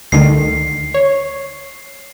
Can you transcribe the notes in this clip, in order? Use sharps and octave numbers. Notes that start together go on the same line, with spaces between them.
D2 D3 D#3 C7
C#5